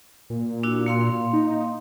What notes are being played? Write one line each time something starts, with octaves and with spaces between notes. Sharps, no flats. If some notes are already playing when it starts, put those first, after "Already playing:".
A#2
D4 E4 F#4
A#3 F5 C6
D#4